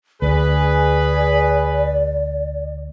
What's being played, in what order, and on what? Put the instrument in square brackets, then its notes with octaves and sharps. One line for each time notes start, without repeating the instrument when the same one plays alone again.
[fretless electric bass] D2 [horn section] G#4 B4 [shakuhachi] D5